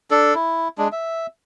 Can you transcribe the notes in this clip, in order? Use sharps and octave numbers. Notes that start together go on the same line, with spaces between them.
D4 A4
E4
G#3 D4
E5